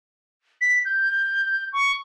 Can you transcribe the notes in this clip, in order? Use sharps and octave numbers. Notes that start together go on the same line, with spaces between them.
B6
G6
C#6